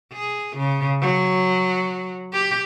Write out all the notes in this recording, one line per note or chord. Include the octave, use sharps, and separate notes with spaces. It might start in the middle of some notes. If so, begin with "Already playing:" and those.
G#4
C#3
F#3
G4